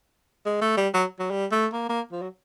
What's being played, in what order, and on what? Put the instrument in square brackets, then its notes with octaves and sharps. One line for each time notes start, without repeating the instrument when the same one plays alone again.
[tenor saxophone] G#3
A3
G3
F#3
F#3
G3
A3
A#3
A#3
F3
F#3